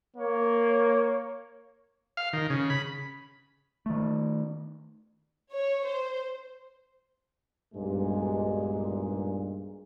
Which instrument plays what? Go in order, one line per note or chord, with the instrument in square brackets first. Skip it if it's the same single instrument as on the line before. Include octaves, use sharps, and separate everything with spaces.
[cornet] A#3 [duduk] C#5
[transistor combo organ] F5
D#3
C#3
B5
[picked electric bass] D#3 A3
[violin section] C#5
C5
[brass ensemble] B1 G2 A#2 G#3